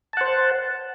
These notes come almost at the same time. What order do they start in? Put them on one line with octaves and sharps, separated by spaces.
A5 F#5 C5